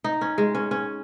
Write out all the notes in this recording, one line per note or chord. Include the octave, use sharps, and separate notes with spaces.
D#4
C#4
G#3
C#4
C#4